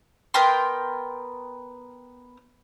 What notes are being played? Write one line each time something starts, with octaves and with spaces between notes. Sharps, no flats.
B3 A#4 G5 C6